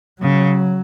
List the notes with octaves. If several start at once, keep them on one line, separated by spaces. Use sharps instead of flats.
C#3 F#3